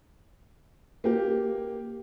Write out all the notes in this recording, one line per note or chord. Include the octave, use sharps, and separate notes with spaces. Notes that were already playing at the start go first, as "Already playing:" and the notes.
A#3 G4